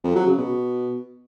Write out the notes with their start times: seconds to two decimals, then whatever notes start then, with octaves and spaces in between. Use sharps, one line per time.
0.04 F2
0.15 F#3
0.27 C#3
0.38 B2